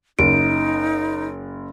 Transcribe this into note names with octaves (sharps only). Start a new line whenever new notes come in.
F#1 D#4 D7